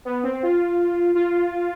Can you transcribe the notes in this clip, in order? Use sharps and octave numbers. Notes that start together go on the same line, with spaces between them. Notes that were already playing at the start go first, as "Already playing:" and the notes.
B3
C4
F4
F4